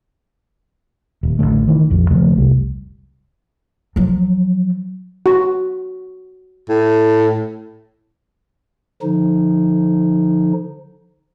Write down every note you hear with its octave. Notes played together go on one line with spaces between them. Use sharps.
D#1
A1 G2 D3 A3
D#3 E3
A#1 F2
D#2 C#3 F3 A3
F1 C2 G3
F3 F#3
F#4
A2
D3 F3 D#4